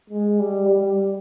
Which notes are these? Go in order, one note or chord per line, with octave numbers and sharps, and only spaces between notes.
G#3
G3
G3